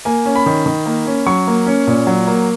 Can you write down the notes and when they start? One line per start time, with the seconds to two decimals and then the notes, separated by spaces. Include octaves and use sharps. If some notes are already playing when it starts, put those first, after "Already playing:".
0.05 A#3 G#5
0.26 C#4
0.35 B5
0.46 D#3
0.66 D#3
0.86 A#3
1.06 C#4
1.26 F#3 C#6
1.47 A#3
1.67 C#4
1.87 A#2
2.07 F#3
2.27 A#3